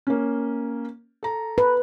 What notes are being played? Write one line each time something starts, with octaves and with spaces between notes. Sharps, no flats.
A#3 C#4
A4 A#5
B4